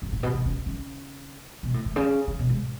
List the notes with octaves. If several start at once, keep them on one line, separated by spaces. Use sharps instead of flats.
F#2
A2
B2
B2
C#3
C#3
B2
A2
A2
C#3
C#3
B2
G#2